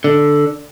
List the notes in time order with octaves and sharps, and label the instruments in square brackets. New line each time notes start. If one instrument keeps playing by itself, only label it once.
[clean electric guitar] D3